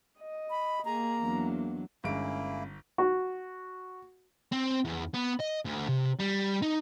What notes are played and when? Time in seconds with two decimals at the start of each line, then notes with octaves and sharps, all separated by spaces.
0.19 D#5
0.50 B5
0.85 A#3 G#4 A#5
1.20 E2 F#3 D4
2.04 G1 G2 G#3 A#3 C#4 E4 D7
2.98 F#4
4.52 C4
4.85 E2
5.14 B3
5.40 D#5
5.65 D2
5.89 C3
6.20 G3
6.62 D#4